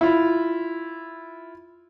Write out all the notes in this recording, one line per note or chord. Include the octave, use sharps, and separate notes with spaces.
E4 F4